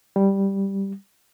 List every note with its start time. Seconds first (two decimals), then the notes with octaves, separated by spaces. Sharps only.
0.16 G3